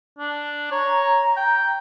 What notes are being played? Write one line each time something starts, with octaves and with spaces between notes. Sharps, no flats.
D4
C#5 A#5
G5